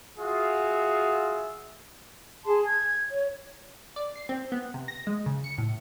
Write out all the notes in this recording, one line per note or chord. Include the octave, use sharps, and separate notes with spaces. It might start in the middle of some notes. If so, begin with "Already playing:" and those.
F4 F#4 G#4 E5
G#4 A5 C6
G#6
C#5
D5
C7
C4
B3
C3
A#6
G#3
C#3
C#7
A2